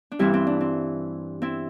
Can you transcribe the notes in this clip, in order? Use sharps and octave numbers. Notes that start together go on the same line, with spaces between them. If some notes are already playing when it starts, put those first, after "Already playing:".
D4
G2 E3 G3 C4 E4
C4
D4
C4
C4 E4